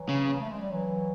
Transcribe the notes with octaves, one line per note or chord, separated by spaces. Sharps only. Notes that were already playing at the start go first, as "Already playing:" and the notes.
Already playing: E3 F#3
C#3
A#3
A3
G#3
G3
E3 F#3